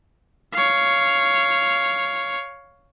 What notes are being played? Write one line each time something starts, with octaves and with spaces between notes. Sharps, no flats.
C#5 F5